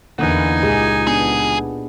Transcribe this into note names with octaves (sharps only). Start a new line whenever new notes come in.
E2 D3 A#3 D#4 E4 F#5 G#5
C#2 A#2 G4 G#4
B3 D4 G#4